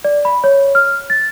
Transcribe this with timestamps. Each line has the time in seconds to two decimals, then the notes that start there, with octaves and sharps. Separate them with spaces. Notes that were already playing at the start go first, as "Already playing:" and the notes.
0.05 D5
0.25 B5
0.44 C#5
0.75 F6
1.10 A6